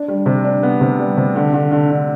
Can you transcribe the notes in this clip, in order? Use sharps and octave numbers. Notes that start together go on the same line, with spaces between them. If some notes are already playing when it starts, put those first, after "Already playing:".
Already playing: D4
G3
C3
D4
B3
C3
G3
C3
D3
D3
D3
D3